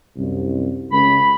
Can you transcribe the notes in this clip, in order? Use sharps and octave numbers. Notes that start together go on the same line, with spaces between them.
C2 F#2
C#2 B5